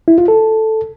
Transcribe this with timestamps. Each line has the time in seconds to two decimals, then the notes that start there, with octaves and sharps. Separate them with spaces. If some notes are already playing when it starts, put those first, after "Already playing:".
0.08 E4
0.18 F4
0.28 A4